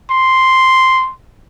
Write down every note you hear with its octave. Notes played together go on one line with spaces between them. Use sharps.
C6